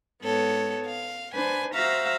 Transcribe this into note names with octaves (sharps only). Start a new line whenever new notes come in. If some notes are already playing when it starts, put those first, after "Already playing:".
G#2 B3 A4 C#5
F5
D4 B4 C5 G#5
F#4 C5 E5 F5 A#5 E6